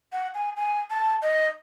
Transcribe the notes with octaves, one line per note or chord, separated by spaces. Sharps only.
F#5
G#5
G#5
A5
D#5